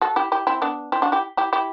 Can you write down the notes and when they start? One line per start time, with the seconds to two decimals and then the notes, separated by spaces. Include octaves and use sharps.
0.01 F#4 A4
0.16 E4 G4
0.32 E4 G4
0.47 C4 E4
0.62 B3 D4
0.92 C4 E4
1.02 D4 F#4
1.12 E4 G4
1.37 E4 G4
1.53 E4 G4